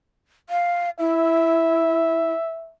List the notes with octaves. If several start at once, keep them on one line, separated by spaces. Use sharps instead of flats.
F5
E4 E5